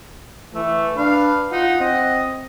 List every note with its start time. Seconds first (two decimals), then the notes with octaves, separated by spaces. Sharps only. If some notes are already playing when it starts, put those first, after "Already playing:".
0.54 E3 A3
0.97 D4 B4 F5
1.51 D#4 F4 F#5
1.80 C4 D#5